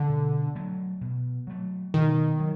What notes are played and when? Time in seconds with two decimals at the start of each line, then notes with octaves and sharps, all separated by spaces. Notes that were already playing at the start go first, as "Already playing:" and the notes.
Already playing: D3
0.09 B2
0.55 F#3 A3
1.01 B2
1.47 F#3 A3
1.94 B2 D#3
2.39 F#3